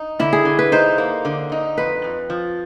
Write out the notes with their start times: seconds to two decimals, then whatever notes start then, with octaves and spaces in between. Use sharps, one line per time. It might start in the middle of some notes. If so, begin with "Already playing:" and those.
Already playing: D#4
0.19 D3 E4
0.33 G#4
0.45 D3
0.59 B4
0.72 D#4 C5
0.98 A#3
1.25 D3
1.52 D#4
1.78 F2 B4
2.04 F2
2.30 F3